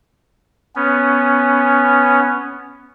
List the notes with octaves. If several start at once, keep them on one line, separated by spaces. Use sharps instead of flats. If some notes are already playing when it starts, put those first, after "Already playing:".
B3 C#4